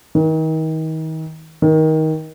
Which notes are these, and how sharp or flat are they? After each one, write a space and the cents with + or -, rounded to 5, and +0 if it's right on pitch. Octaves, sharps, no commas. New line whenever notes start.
D#3 +35
D#3 +20